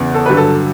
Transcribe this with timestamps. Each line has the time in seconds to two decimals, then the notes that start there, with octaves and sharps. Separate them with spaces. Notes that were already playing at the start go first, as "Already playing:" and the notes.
Already playing: E2 C#3 E3
0.14 A4
0.26 G2 D3 F#3 B4
0.37 A4